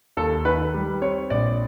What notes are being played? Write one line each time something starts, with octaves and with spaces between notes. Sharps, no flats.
D#2 A4
D#3 B4
G3
C4 C#5
A#1 D5